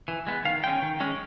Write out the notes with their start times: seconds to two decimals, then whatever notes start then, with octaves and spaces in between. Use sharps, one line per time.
0.08 E3
0.27 G#3 B3
0.45 D#3 F5
0.63 G#3 C#4 G5
0.82 D#3
1.00 G#3 C#4